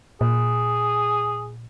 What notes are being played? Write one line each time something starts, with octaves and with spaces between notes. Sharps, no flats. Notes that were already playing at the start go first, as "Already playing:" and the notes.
A#2 G#4